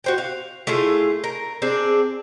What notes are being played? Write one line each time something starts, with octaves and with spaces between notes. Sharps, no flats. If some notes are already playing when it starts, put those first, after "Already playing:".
F#4 C5 G5
F5
A3 E4 F4 G#4
A#4
C4 D4 G#4